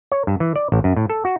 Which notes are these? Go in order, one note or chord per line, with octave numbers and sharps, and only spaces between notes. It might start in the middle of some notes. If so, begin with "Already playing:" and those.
C#5
G2
E3
D5
A1
F#2
A2
A4
F#4